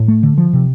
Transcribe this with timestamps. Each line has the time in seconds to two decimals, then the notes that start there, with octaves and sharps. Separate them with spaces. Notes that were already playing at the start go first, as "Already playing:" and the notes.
Already playing: A2
0.08 A3
0.23 D3
0.38 F3
0.53 C3